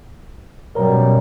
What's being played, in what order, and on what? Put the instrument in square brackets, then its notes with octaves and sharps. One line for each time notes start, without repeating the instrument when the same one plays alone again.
[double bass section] F#2 B2 G3 [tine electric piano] A#4 C#5 A#5